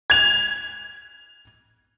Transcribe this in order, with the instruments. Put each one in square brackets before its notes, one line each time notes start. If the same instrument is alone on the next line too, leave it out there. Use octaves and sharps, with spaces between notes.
[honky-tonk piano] G#6 F7